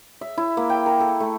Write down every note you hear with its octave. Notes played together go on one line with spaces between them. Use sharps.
E5
E4
A#3
G5
A#4
A4
A3